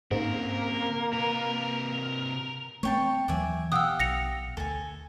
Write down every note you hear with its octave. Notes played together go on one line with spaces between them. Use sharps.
G#2 C#3 A#3 C4 A#4
C3 A#4 B4
A3 B3 C4 C#5 G5 A5
D#2 E3 F#3 D5 E5 G#5
B2 G4 F5 F#5 D#6 E6
B1 A#6 C#7 F7
D2 A4 G#5